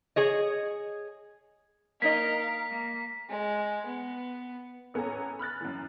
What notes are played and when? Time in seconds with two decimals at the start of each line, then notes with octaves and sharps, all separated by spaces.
0.16 G#4 C#5 D#5
2.02 A#3 D#4 A#4 D#5 F5 B6
2.70 A#3
3.30 G#3
3.86 B3
4.94 A1 B3 C#4 A4 G#5 A#5
5.39 B5 F6 F#6 A6
5.61 F#2 E3